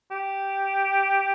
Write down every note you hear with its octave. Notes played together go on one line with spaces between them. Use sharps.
G4